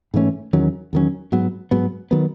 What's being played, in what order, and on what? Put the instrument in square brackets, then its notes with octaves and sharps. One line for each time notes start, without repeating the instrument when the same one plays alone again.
[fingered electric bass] G#2 E3 A3 C#4
E2 D#3 F#3 C#4
E2 D#3 F#3 C#4
G#2 F#3 B3
G#2 F#3 B3
D#3 F#3 B3